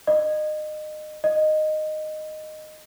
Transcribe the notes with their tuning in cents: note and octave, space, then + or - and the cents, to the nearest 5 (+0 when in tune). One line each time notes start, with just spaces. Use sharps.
D#5 -30
D#5 -10